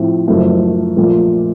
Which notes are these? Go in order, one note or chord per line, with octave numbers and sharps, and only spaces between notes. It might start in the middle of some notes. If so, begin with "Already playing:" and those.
Already playing: A2 F3 C4
F#1 F#2 F3 A3
A#1 A#2 A3